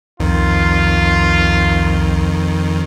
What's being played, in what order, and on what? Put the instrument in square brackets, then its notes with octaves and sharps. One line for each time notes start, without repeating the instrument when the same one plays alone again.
[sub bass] C2 [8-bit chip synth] F2 D#3 [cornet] F4